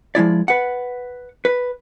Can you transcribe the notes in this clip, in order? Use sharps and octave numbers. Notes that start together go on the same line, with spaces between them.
F3 G#3 E4 D5
B4 F#5
B4